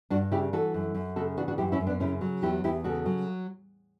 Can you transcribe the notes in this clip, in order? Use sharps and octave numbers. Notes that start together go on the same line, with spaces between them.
G2 D4 F#4
C#3 E4 G4
E3 F#4 A4
F#2
F#2
C#3 F#4 A4
E3 D4 F#4
D4 F#4
F#2 E4 G4
C#4 E4
F#2
B3 D4
C#3 C#4 E4
F#3
E2 E4 G4
E2 E4 G4
C#3 F#4 A4
F#3